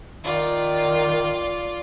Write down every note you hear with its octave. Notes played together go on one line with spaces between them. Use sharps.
D#3 F4 D5